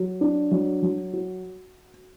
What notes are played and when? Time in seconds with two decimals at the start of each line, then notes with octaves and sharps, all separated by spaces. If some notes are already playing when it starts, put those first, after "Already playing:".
Already playing: F#3
0.21 D4
0.51 F#3
0.82 F#3
1.13 F#4